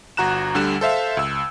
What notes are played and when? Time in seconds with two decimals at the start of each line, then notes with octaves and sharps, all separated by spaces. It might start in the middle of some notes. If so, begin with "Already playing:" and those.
0.17 G1 F#4 A#5 F#6 E7
0.55 D2 D3 G3 E7
0.81 A4 C5 E5 F5
1.17 C#2 E6